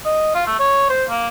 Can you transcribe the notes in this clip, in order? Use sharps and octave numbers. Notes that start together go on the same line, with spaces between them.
D#5
F4
A3
C#5
C5
A#3